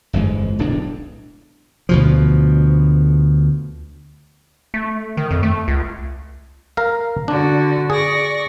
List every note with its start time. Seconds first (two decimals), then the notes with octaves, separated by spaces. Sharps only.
0.13 G1 F2 E3 G#3
0.59 D1 B1 F2 D4
1.89 D2 B2 F3
4.74 A3
5.17 D#3
5.31 F2
5.43 A3
5.68 C#2
6.77 A#4 F5
7.28 D3 D4 F#4
7.90 G#4 D5 C#6 A#6